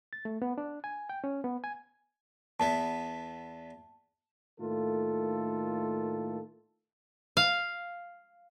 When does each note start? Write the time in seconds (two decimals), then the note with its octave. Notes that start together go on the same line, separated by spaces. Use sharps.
0.13 A6
0.25 A3
0.42 B3
0.58 D4
0.84 G#5
1.09 G5
1.24 C#4
1.44 B3
1.64 G#5
2.60 E2 B3 E4 A5
4.60 A2 D#3 A3 A#3 F4 A4
7.37 F5